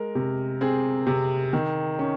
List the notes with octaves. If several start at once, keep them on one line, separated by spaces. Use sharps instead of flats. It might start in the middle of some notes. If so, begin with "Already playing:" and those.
Already playing: G#3 A#4
C3
C4 G#4
C3
D#3
C#4